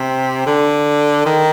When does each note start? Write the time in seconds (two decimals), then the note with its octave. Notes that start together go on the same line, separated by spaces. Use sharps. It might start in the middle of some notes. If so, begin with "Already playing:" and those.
Already playing: C3
0.47 D3
1.26 D#3